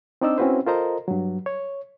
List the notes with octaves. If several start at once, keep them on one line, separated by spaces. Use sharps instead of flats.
C4 D4 D#4 D5 D#5 E6
C4 C#4 E4 F#4 B4 C5
F4 A4 A#4 C5 D#5 A#5
G2 F#3
C#5